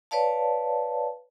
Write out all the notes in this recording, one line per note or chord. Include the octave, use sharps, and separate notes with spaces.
B4 C#5 D5 F5 A5